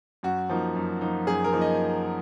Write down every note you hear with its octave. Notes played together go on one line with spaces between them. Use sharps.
F#2 F#4
F3 A#3 D#4
F#2
F3 A#3 D#4
F#2 G#4
A#4
F3 A#3 D#4
D#5